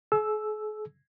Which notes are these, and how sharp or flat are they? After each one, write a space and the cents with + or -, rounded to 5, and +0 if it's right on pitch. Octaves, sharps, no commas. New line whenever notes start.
G#4 +45 E6 +0